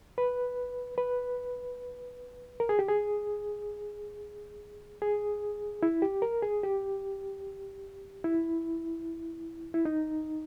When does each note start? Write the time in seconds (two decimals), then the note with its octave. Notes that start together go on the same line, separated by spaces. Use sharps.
0.18 B4
0.98 B4
2.60 A#4
2.69 G#4
2.79 G4
2.88 G#4
5.02 G#4
5.83 E4
6.02 G4
6.22 A#4
6.43 G#4
6.63 G4
8.24 E4
9.74 E4
9.85 D#4